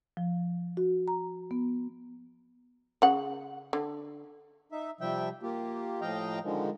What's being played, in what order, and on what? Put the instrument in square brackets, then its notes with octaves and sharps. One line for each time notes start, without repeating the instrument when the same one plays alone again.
[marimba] F3
F#4
A#5
B3
[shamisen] C#3 F#5
D3
[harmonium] D#4 E5
C3 F3 G3 E5 G5
A#3 F4 G4
A2 F3 D#5 F5 G5 A#5
D3 D#3 F3 G#3